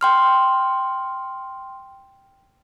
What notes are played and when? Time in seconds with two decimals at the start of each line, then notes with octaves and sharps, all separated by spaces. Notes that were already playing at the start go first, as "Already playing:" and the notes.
0.01 G5 C6 F6